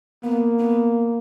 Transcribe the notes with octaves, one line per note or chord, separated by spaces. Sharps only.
A#3 B3
B3